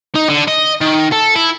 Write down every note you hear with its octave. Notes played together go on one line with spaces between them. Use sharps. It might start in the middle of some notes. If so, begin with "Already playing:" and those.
D#4
D3
D#5
D#3
A4
E4